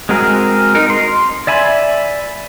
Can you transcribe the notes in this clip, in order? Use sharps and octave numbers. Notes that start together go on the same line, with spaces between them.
G#3 C4 F#4 G#4 A#4
D#4 A#4
C6
D5 E5 G#5 B5